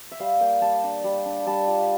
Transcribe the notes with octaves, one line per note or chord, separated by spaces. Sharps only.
E5
G3 F5
A#3 G5
G3 A5
D4
G3
D4
G3 A5
F4